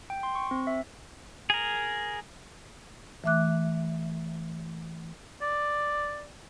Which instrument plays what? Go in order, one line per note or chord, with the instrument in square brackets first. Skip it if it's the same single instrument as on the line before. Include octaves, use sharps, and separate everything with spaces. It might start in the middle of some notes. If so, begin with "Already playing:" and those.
[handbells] G5
C6
C#6
C4
E5
[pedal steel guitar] G#4 A#4
[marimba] E3 A3 E5 D6 F#6
[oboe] D5